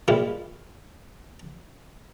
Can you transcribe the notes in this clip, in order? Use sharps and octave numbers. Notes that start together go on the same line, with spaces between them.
A#2 G3 G#3 E4 F4